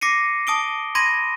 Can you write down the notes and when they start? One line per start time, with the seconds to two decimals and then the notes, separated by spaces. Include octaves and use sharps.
0.01 D6 A#6 C7 C#7 D#7
0.47 A5 D#6 D7 G7
0.95 B5 C6 G#6 A#6 D#7